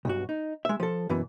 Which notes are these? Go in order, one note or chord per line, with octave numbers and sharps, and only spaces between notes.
B1 G2 F#4
D#4
G#3 E5
F3 A4
F#2 B2 E3